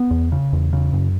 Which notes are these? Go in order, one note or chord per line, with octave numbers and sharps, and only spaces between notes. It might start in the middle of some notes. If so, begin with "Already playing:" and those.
Already playing: B3
E2
C#3
E2
C#3
F#2